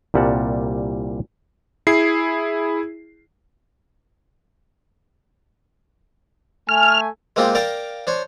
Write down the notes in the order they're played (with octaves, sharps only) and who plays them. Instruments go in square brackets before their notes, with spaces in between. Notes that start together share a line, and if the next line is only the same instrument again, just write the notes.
[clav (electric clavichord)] C2 A#2 G3 A#4 F#5 A5
[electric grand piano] E4 G#4 C7
[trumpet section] A3 G#5 [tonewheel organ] F6
[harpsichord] G#3 A#3 C4 D#4 F4 G4
A#4 D5 F5 G5 A5 A#5
D4 C5 C#5